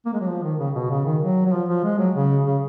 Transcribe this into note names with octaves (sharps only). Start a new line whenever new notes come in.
A#3
G#3
F#3
F3
D#3
C#3
B2
C#3
D#3
F#3
F#3
F3
F3
G#3
F#3
C#3
C#3